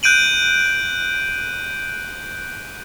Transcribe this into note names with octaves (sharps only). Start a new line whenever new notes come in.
F#6 G6 D7 D#7 F#7